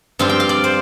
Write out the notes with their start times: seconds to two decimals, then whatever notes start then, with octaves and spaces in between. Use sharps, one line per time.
0.19 G2 F3 C4 F4 F5
0.29 G5
0.40 F5
0.49 D5
0.64 C5